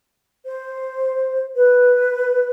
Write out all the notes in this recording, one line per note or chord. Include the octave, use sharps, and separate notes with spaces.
C5
B4